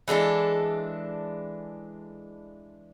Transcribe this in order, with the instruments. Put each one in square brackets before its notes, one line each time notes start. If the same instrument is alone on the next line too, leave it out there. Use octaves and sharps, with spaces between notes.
[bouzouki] E3 G#3 D4 A4